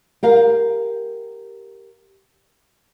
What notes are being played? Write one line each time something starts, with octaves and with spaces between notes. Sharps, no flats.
G4 A#4 F5